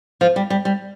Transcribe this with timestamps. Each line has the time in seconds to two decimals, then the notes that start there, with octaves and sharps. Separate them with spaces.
0.21 F3
0.36 G3
0.50 G3
0.65 G3